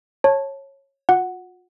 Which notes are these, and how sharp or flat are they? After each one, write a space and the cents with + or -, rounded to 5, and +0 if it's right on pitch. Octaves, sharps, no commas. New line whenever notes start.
C#5 -15 A5 -5
F4 +45 F#5 +0